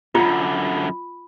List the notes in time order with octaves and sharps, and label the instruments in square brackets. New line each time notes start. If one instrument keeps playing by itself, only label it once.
[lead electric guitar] F#2 D3 [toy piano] F4 [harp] B5 A#6 C#7